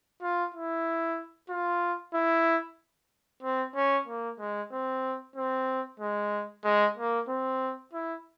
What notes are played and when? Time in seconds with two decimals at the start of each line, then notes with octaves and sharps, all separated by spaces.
0.22 F4
0.54 E4
1.50 F4
2.14 E4
3.42 C4
3.76 C#4
4.08 A#3
4.39 G#3
4.72 C4
5.36 C4
6.00 G#3
6.64 G#3
6.97 A#3
7.28 C4
7.93 E4